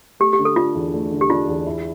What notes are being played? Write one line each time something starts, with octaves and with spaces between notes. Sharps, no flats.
A3 G4
G4
D3
A4
D4 F4
E2
A3
D3
G4
D4 F4
E2
E4